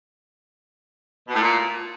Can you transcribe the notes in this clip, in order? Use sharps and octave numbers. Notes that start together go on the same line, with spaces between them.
B2
A2
A#2